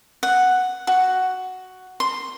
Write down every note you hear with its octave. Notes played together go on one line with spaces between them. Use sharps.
F#5
F#4
C6